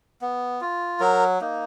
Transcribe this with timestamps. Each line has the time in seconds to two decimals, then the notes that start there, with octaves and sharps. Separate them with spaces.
0.21 B3
0.61 F4
1.00 F#3 A#4
1.41 A#3 D#4